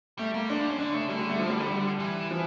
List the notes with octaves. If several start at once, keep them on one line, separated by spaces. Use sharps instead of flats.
G3 A3
G3 A#3
F3 D4
G3
F3 C#4
D3 D4
C#3 A3
D3 G3
G3
A3
F3
G3
G3
E3
F3